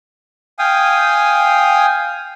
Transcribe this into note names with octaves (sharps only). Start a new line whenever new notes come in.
F5 G5 G#5 D#6